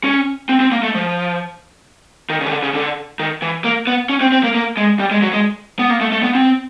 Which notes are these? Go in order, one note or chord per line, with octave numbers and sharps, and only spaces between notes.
C#4
C4
C4
A#3
A3
F3
D#3
C#3
D#3
D3
C#3
D3
D#3
E3
A#3
B3
C#4
C4
C4
A#3
A#3
G#3
G3
G#3
F#3
G#3
B3
A#3
A3
A3
B3
C4